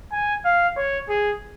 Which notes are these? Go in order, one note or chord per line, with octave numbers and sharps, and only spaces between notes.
G#5
F5
C#5
G#4